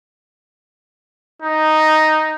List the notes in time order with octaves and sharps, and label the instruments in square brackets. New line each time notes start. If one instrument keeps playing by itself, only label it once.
[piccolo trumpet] D#4